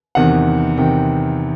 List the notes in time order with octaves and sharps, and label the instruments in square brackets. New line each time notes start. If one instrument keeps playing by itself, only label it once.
[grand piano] E2 C3 D#3 F#5
E2 C3 D#3 G5